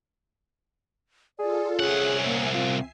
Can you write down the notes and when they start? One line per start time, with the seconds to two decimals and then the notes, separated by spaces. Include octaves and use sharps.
1.39 F4 G#4 A4 D5
1.80 C2 C#4 G#4 E5 F#5 G#5 C7
2.25 A#3
2.54 C4 F4